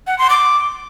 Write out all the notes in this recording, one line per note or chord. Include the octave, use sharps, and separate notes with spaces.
F#5
C6
D6